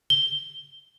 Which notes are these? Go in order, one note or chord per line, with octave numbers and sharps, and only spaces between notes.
G7